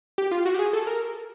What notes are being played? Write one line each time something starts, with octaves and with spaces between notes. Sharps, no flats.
G4
F4
F#4
G4
G#4
A4
A#4